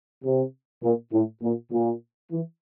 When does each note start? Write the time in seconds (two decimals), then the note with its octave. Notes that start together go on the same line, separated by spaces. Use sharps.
0.24 C3
0.83 A#2
1.12 A2
1.42 A#2
1.72 A#2
2.31 E3